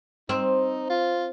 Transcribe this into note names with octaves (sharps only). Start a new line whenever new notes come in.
C4 D#4
F4